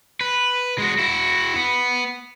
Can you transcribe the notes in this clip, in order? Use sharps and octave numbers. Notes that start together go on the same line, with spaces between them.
B4
G#3 F#4
E4 F#4
B3